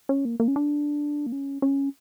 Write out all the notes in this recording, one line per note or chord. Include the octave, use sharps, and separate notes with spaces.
C#4
A#3
A#3
C#4
D4
A#3
C#4
C#4